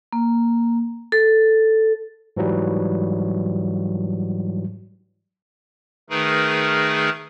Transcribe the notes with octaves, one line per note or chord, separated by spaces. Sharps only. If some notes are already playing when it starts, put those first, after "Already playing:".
A#3
A4
G#2 E3 F#3 G3
D#3 A3 D#4 G#4 A#4 B4